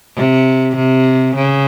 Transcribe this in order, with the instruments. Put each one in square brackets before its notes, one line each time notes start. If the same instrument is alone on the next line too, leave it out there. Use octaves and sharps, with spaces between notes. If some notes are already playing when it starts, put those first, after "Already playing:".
[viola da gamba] C3
C3
C#3